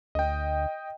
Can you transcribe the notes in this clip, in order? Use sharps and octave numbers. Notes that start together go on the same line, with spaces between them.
D2 D#5 G5